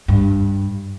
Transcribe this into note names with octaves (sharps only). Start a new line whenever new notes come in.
G2